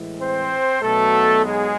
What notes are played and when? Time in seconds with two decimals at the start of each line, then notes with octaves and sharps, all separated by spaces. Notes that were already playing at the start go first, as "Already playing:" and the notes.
Already playing: A2 E3 G#3
0.20 C4 C5
0.82 B1 B2 F#3 A3 B3 A4
1.45 G#3 G#4